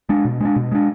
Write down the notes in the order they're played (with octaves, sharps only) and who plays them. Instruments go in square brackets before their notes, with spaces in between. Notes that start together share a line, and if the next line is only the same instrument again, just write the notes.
[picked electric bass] G#3 D4
B2
G#3 D4
B2
G#3 D4